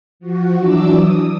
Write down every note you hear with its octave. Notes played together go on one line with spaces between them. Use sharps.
F3 F#4
E3 F#3 D4 D6 E6
D#6